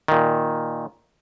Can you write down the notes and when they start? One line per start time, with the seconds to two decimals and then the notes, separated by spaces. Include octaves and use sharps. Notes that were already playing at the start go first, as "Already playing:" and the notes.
0.08 A#2 D#3